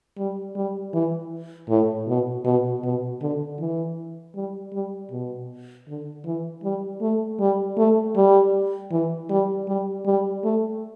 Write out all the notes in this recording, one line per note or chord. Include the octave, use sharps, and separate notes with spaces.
G3
G3
E3
A2
B2
B2
B2
D3
E3
G3
G3
B2
D3
E3
G3
A3
G3
A3
G3
E3
G3
G3
G3
A3